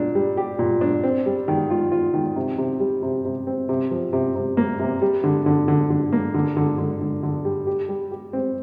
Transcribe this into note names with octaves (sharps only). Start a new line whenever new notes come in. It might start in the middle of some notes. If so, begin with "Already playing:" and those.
Already playing: A#2 D4
G3
G4
A#2
D4
C4
G3
D#3
F4
F4
D#3
C3
C3
G3
C3
C3
C4
C3
F3
C3
C3
A#3
C3
G3
D3
D3
D3
D3
A#3
D3
D3
D3
D3
D3
G3
G4
G3
G4
C4